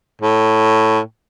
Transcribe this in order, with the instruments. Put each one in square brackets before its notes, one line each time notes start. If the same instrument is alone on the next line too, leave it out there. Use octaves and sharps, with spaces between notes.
[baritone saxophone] A2